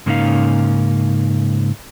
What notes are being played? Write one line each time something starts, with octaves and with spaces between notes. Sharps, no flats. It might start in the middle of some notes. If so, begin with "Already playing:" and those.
G#2 C#3 A#3 C#4 D#4 F5